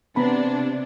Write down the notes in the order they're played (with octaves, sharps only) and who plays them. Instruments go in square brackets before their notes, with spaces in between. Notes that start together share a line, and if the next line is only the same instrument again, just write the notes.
[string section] C3 D4 [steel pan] B3 A#5 B5